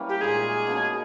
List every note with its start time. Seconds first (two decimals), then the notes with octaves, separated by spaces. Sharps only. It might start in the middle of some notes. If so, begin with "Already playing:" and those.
Already playing: E3 G3 A#3 C#4
0.09 G4
0.21 A#2 G#3 D#4 G#4
0.67 B2 A#3 C#4